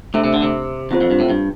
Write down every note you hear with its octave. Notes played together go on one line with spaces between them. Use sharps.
C3 A3 D4 A4 E5
C3
D3
C3
E2 C4 F4 C5
F2
G2
A2
G2